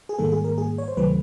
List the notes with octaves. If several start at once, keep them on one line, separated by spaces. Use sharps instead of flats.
G#4
G#2 D#3 G3 A#3 A4
G#4
A#4
G#4
C#5
C5
D2 C3 D#3 F#3 A3 B4